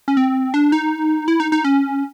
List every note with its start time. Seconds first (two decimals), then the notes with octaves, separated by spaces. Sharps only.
0.08 C#4
0.17 C4
0.54 D4
0.72 D#4
1.28 E4
1.40 D#4
1.52 D#4
1.64 C#4